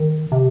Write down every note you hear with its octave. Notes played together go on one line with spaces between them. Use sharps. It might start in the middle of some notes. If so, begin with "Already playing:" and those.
Already playing: D#3
C3